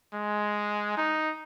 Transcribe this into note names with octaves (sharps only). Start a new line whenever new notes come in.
G#3
D#4